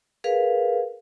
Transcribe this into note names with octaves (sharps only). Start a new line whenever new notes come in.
G#4 A#4 B4 F5